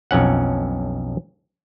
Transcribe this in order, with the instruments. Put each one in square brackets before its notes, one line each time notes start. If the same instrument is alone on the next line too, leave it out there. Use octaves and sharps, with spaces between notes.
[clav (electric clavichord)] B1 F2 C#4 F#5